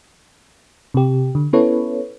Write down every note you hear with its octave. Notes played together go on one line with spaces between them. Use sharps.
C3 G4
D3
B3 C#4 E4 A4 B4 C#5